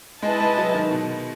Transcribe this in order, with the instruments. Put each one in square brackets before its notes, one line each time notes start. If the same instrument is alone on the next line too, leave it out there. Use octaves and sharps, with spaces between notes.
[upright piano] G#3 [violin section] E4 B4 D#5 A5
[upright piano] G#3
F#3
D#3
B2